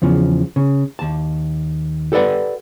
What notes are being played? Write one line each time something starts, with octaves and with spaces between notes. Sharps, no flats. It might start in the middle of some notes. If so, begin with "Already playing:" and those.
E2 C#3 F3
C#3
D#2 A5
G4 A4 B4 D5 F#5